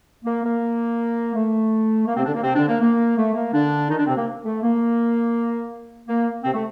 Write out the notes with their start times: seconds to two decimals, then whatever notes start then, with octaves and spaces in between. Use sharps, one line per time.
0.25 A#3
0.43 A#3
1.35 A3
2.07 A#3
2.16 C3 C4
2.25 D3 D4
2.34 A#3
2.43 C3 C4
2.56 D3 D4
2.68 A#3
2.81 A#3
3.17 A3
3.34 A#3
3.53 D3 D4
3.90 D#3 D#4
3.98 D3 D4
4.07 C3 C4
4.16 A#3
4.45 A3
4.62 A#3
6.09 A#3
6.44 C3 C4
6.54 A3